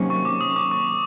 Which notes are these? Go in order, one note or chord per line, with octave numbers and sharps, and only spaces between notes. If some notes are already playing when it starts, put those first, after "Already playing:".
Already playing: C3 D#3 F#3 A#3 C#4
C#6
D6
D#6
D6
C#6